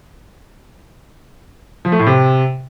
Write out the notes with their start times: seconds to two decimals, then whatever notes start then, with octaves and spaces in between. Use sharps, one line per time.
1.85 F3
1.92 A3
1.99 A2
2.07 C3